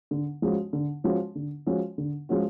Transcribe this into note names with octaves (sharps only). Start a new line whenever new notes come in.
D3
F3 G#3 C#4 F#4
D3
F3 G#3 C#4 F#4
D3
F3 G#3 C#4 F#4
D3
F3 G#3 C#4 F#4